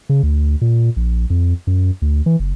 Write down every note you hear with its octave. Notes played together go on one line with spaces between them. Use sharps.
C#3
D2
A#2
A#1
F2
F#2
D2
E3
F#1